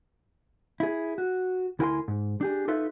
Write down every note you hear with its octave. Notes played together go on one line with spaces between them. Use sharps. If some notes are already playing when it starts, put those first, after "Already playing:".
E4 G#4
F#4
D2 E4 A#4 G5 G#5 C6
G#2
D4 G4 G#4
D#4 F4 A4 B4 E5